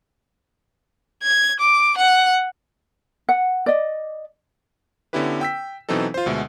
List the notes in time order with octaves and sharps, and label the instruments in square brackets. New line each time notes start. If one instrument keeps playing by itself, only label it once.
[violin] G#6
D6
F#5
[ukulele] F#5
D5 D#5
[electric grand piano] D3 B3 C#4 E4 G4 B4
G5 E6 B6
B2 E3 F#3 C4 D#4 A4
F4 C5
D2 B2 G#3 E5